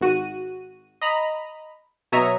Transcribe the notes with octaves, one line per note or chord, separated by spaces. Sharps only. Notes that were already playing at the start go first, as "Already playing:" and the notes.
G#1 F#4 D#7
D#5 A#5 B5
B2 F#3 C#5 E5 A#5 D#6